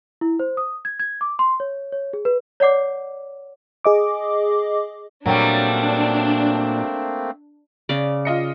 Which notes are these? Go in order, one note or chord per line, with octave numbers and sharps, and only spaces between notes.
E4
C5
D#6
G#6
G#6
D6
C6
C#5
C#5
G#4
B4
C#5 D5 F#5 D6
G#4 D#5 D6
A#2 F#3 G3 A3 A#3 C4 D4
C#3 D5
F4 D#5 C#7